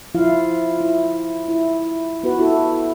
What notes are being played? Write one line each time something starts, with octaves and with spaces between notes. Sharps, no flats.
F3 E4 F4 F5
E4
E4
B3 F#4 B4
E4 F#4 A4